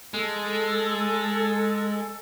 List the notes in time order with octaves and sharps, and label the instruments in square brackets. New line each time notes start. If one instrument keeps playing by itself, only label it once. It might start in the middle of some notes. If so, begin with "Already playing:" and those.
[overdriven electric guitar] G#3 [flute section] A4